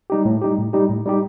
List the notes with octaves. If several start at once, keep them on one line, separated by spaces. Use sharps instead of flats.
G3 D#4 G4
A2
G3 D#4 G4
A2
G3 D#4 G4
A2
G3 D#4 G4